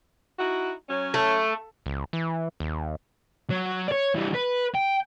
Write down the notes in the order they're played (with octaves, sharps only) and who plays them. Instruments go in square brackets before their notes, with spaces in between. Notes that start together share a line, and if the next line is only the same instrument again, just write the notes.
[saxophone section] D#4 E4 F#4
F#3 C#4
[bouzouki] A3
[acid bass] C#2
E3
D#2
[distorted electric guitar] F#3
C#5 D5
E3 G3
B4
G5